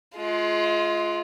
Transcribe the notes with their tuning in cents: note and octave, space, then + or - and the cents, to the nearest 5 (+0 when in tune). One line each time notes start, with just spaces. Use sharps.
G#3 +30 F4 +0